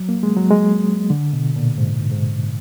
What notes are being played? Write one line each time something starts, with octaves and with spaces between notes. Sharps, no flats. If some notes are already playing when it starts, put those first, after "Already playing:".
Already playing: F#3
A#3
G#3
F#3
G#3
D3
B2
A#2
G#2
G#2